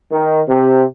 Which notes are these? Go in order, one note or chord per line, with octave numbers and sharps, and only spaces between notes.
D#3
C3